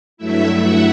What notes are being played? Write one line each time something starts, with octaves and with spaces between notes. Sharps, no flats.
G2 F#3 A3 E4 E5
F#5